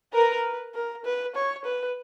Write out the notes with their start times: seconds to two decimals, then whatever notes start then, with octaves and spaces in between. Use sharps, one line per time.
0.13 A#4 B4
0.74 A#4
1.05 B4
1.35 C#5
1.65 B4